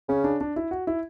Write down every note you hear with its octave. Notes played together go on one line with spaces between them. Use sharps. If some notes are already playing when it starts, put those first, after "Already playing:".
C#3 C#4
D4
D4
E4
F#4
E4